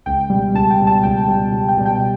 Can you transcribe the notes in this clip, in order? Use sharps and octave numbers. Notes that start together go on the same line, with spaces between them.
C#2 G5
B2 G3
C#2 A5
G5
B2 G3
A5
C#2 G5
B2 G3
C#2
G5
B2 G3
G5